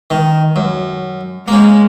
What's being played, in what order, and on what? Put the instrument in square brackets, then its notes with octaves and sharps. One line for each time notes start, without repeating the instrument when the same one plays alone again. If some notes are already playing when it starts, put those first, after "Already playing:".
[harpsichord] D#3
F#2
[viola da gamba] G#3 [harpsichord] A#3 C#4